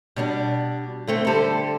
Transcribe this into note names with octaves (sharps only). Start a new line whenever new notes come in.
B2 G3 D4
D3 A3 C4
D3 G3 G4 A4 C5